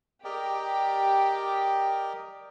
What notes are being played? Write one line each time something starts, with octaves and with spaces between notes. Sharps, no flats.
G4 A#4 D5 D#5